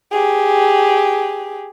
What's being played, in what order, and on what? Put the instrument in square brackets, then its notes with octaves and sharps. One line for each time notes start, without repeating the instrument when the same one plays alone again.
[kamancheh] G4 G#4